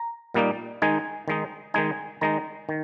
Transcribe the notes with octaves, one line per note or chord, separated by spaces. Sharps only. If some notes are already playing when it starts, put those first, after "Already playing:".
Already playing: A#5
A#2 G3 A#3 D#4
D#3 G#3 D#4 G#5
D#3 G#3 D#4
D#3 G#3 D#4 G#5
D#3 G#3 D#4 A#5
D#3